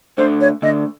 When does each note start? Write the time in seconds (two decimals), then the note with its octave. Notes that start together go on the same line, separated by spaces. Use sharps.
0.18 D2 D3 C5
0.41 C#5
0.62 D2 D3 D#5